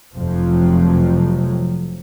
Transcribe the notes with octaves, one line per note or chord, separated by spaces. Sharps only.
F1 F2 C3 F3 F#3